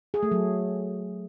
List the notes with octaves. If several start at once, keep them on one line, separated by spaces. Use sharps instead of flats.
G#4
A3
F#3